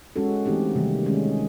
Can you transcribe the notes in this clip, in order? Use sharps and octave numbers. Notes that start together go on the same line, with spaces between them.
G#3 C#4 F#4 A4
E3 A3 C4 D#4 G4
C3 D#3 G3 A#3
D#3 G#3 C#4